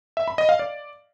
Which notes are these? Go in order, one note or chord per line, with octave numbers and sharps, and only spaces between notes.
E5
B5
D#5
F5
D5